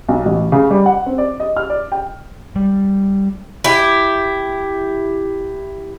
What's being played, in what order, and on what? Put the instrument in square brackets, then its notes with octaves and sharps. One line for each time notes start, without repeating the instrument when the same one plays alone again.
[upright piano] B1
A1
C#3
G3
F#5
C4
D5
D#5
F6
D5
G5
[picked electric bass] G3
[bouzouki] E4 G4